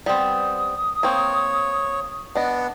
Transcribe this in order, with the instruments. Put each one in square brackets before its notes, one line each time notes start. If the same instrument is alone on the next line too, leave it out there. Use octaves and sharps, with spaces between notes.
[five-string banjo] G3 B3 C4 [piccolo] D#6
[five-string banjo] A#3 C4 [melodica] C#5
[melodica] B3 [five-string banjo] D4 D#5 [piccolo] F#5